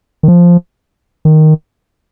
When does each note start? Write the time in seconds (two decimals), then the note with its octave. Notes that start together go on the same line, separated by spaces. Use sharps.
0.23 D#3
0.28 F3
1.25 D#3